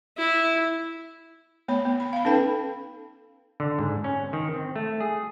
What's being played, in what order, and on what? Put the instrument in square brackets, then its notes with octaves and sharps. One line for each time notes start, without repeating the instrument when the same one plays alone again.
[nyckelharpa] E4
[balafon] A3 B3 C#5 B5
B3
B5
F5 B5
C#4 D#4 A4 B4 G5
[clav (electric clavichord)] D3
G#2
C#4
D#3
C4
A3
G#4